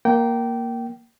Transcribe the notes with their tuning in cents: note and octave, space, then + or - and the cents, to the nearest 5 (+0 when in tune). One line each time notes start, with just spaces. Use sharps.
A#3 +5 G5 -20